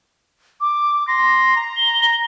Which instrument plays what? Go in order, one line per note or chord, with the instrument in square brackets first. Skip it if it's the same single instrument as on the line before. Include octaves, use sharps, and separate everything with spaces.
[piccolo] D6
[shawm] C6 [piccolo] A#6
[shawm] A#5
[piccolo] G7